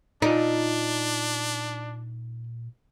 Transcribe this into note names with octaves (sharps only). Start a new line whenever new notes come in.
A#2 D4 D#4 F4 D5